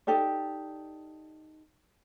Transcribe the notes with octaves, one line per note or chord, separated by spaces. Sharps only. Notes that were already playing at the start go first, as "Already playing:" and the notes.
D#4 G4 A4 D5